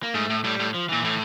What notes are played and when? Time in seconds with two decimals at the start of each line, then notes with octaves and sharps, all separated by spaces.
0.03 A#3
0.14 G#2 A3
0.30 A2
0.44 A2 G3
0.60 A2
0.74 F3
0.89 A#2 E3
1.04 A2 E3